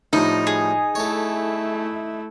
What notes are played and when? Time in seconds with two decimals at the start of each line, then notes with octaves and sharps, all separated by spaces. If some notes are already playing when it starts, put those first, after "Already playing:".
0.13 A2 F3 G3 D#4
0.47 G#4
0.95 A3 E4 A4 C#5